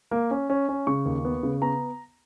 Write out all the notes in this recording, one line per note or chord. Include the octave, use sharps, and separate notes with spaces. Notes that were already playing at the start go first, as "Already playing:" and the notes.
A#3
C#4
C#4
C#4
C#3 C#6
D#2
B3
C#3
B3 A#5